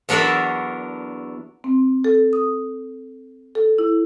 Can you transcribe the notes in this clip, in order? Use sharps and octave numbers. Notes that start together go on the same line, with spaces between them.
E2 F#3 D4 A#4 E5 B5
C4
A4
D#6
A4
E4